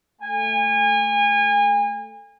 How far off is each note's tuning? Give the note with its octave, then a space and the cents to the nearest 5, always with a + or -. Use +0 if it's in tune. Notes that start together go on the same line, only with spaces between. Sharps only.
A3 +5 G#5 -30